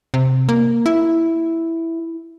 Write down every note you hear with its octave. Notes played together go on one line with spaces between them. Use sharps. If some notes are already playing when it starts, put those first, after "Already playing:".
C3
A#3
E4